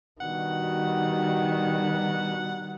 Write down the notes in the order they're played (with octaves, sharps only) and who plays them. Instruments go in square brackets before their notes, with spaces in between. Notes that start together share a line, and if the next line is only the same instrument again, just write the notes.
[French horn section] B2 D4 F#4 [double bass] D#3 G3 [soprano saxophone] F#5